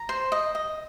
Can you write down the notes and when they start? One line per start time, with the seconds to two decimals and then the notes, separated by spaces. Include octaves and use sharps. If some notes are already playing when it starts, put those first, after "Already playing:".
Already playing: A#5
0.09 C5
0.32 D#5
0.55 D#5